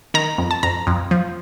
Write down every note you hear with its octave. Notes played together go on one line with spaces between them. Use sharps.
D#3 A#5
F2
A5
F2 A#5
F2
F3